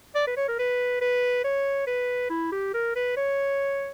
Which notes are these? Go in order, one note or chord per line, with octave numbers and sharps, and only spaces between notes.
D5
B4
C#5
A#4
B4
B4
C#5
B4
E4
G4
A#4
B4
C#5